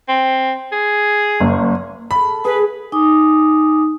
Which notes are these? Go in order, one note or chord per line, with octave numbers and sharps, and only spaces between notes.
C4
G#4
F#1
A4 F5 B5
G#4 B4
D#4 G#5 D6 D#6